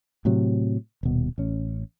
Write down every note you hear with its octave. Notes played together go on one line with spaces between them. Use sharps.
A2 C3 F#3
D#1 B2
A1 C#4